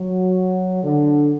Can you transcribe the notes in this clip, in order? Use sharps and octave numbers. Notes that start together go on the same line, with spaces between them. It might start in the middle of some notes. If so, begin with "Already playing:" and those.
Already playing: F#3
D3